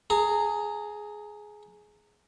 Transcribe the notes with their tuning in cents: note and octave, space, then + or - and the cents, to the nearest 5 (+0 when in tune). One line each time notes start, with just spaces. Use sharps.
G#4 +10 A#5 -25